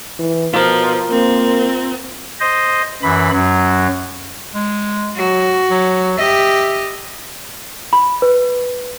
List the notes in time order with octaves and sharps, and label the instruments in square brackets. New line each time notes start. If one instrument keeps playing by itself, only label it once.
[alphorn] E3
[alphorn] B2 [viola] F3 [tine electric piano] F4 A#4
[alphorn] A#3 [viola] C4
[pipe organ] C5 D#5
F#2 E3 B5
F#2 F#3
[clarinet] G#3
[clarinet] F#3 [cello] F#4
[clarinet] F#3
[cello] G4 D#5 [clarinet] E5
[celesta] B5
B4